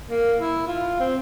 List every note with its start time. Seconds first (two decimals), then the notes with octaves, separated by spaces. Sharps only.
0.10 A#3
0.38 E4
0.67 F4
1.00 C4